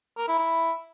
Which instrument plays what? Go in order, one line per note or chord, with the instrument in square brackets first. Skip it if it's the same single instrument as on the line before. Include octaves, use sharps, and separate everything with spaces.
[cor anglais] A#4
E4
E4